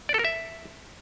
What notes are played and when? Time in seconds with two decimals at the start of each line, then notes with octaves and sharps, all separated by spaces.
0.09 D5
0.14 A4
0.19 A#4
0.25 E5